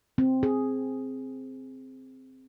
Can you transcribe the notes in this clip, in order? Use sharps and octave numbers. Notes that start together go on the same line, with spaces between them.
C4
G#4